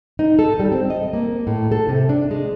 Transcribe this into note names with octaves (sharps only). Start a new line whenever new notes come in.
D#4
A4
G3
C4
D#5
A#3
A2
A4
C3
D4
G#3